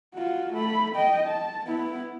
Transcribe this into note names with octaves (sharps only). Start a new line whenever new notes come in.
F4 F#4
A3 B5
D#5 G5
A5
B3 E4